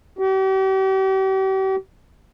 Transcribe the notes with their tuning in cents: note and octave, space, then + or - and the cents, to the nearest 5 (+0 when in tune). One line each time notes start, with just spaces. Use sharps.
G4 -40